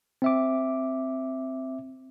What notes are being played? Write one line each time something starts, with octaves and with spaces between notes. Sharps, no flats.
C4 E5 D6